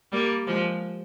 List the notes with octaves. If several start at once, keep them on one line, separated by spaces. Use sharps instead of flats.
G3 A#3
F3 G#3